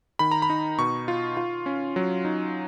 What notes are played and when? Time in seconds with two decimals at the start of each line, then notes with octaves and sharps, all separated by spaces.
0.19 D#3 B5
0.32 A#5
0.42 B5
0.50 D#4
0.78 B2 C#6
1.08 F4
1.37 F4
1.66 C#4
1.96 F#3
2.25 D#4